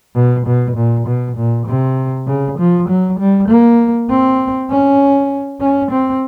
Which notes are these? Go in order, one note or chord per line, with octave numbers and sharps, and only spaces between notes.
B2
B2
A#2
B2
A#2
C3
C#3
F3
F#3
G3
A#3
C4
C#4
C#4
C4